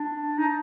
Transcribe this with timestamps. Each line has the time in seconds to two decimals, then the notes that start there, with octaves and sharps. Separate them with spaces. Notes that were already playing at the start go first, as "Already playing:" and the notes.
Already playing: D4
0.39 D#4